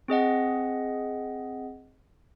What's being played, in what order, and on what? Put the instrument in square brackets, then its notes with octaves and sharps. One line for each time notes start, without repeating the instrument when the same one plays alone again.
[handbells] C4 G#4 D#5 F#5